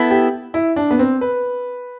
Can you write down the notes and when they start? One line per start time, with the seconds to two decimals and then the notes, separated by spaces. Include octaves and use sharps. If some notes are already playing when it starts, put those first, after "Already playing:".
Already playing: B3 E4 A4
0.11 G4
0.54 E4
0.76 D4
0.91 B3
0.99 C4
1.21 B4